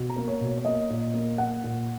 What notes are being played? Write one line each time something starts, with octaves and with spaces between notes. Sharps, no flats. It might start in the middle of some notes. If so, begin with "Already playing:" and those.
Already playing: B2
A#5
A#3
C#5
B2
C#5
C#5
A#3 D#5
A#2
A#3
A#3 F#5
A#2